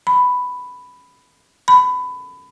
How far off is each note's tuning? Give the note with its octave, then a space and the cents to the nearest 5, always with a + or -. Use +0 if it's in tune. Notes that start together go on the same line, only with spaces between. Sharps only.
B5 +5
B5 +20